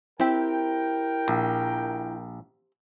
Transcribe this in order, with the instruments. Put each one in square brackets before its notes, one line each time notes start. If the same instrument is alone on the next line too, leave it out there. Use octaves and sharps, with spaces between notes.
[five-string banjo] C4 G4 [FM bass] E4 [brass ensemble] A#4 G5
[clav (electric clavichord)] A#1